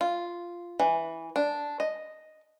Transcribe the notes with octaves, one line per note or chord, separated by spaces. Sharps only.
F4
E3
D4
D#5